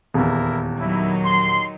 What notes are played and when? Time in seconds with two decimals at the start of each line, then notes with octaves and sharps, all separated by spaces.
0.14 D#1 E2 E4 A#4
0.78 D#3 F#3 D#4 E4
1.24 C6